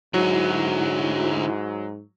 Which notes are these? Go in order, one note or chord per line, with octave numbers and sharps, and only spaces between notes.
G#2 D3 F#3 E4 F#4